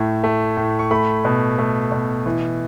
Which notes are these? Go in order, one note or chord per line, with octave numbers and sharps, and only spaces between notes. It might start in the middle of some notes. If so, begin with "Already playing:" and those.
Already playing: A2 A3 E5
A3
A2
C#6
A3 B5
B2
A3
B2
E3